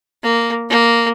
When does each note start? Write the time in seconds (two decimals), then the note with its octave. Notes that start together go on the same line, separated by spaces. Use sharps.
0.23 A#3
0.70 A#3